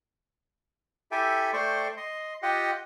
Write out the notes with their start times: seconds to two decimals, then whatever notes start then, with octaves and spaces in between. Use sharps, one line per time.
1.12 E4 G4 A4 E5 G5 G#5
1.53 A3 C5 D5 G5 C6 C#6
1.97 D#5 C6
2.43 F4 G4 D#5 F#5 G5